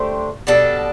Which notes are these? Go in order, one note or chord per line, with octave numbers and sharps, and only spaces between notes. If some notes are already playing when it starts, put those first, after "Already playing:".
Already playing: A3 D4 G4 C5
B2 G3 D4 A4